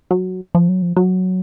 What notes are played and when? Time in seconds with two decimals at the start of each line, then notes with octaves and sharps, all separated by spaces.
0.11 F#3
0.55 F3
0.69 F#3
0.82 F3
0.97 F#3